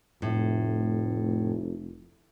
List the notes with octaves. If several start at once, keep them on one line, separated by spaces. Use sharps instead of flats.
F1 A2